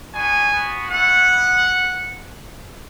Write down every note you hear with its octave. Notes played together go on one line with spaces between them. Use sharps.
B3 D4 F#4 G#5
B3 F#4
A3 E4 F#5
B3 E4